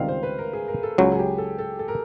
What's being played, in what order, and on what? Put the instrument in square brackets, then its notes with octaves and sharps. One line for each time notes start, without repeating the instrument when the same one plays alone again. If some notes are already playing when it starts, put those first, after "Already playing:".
Already playing: [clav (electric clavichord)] C#2 C3 D#3 G3 C4 [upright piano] E5 F5
[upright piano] C5
B4
A#4
G#4
A#4
A4
[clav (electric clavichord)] C#2 C#3 F#3 [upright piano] G#4
[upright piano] G#4
G4
A4
A4
A4
A#4